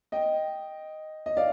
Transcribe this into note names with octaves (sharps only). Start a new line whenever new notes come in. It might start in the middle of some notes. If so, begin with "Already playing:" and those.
D#5 G5
D#5
D5 F5